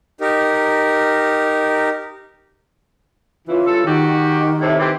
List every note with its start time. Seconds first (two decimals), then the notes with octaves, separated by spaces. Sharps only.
0.21 D#4 G4 A#4
3.48 F2 C#3 E3 F4
3.66 G2 C#3 A4
3.86 D#3 F#4 G4
4.62 A2 C3
4.79 E3 C4 G4